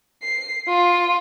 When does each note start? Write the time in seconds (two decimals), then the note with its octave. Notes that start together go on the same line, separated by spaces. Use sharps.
0.23 C7
0.68 F4